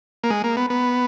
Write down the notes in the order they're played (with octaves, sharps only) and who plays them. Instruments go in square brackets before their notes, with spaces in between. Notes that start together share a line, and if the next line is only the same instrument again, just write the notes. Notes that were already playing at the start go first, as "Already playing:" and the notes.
[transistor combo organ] A#3
G#3
A#3
B3
B3